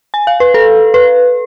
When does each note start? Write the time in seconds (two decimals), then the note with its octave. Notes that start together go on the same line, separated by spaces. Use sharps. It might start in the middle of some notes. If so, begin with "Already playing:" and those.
0.14 G#5
0.27 F5
0.40 B4
0.54 A4
0.94 B4